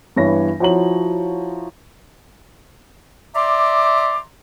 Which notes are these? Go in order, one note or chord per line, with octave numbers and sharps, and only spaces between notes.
G2 E3 B3 C#5 A#6
F3 E4 F#4 C#5 A#5 F#7
D5 E5 A#5 C6 D6